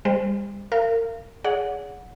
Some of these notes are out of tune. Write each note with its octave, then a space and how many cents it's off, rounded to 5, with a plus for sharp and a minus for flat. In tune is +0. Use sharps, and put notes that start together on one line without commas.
G3 +40 C5 -10
A#4 -30 F5 -30
G#4 +0 C#5 +45 F#5 -20